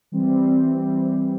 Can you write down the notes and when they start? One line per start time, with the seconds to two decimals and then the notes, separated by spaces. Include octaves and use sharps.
0.12 E3 G3 C4
0.62 E3 G3 C4